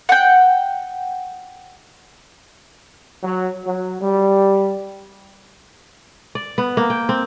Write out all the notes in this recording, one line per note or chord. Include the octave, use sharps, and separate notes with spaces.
F#5 G5
F#3
F#3
G3
D5
B3
A#3
G5
C4